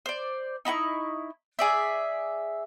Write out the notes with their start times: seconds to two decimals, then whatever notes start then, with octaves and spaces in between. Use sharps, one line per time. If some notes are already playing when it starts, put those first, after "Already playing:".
0.06 C5 D5
0.65 D#4 E4 G#5 C#6
1.59 G#4 D5 E5